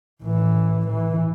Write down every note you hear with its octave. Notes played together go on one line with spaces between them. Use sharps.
A1 E3
E3